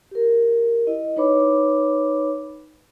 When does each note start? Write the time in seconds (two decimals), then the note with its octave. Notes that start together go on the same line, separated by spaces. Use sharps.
0.11 G4 A#4
0.87 E4 D#5
1.16 D#4 B4 C#5 B5 D6